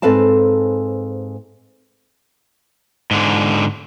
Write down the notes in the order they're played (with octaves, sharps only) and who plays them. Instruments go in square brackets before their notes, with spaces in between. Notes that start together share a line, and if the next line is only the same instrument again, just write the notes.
[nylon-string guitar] G#2 C4 A4 B4 F5 A5
[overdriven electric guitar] G#2 D3